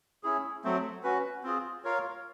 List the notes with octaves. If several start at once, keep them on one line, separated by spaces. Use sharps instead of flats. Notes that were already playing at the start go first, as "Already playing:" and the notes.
C#4 E4 G#4
F#3 A3 C4
C#4 F#4 B4
C4 F4 G#4
F4 A#4 C#5 F5